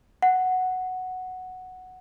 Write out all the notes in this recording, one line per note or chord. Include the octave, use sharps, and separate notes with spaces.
F#5